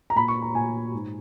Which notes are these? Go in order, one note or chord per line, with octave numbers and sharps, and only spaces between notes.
A#5
A#2 B5
C#6
A#5
A#2 G#5
G#2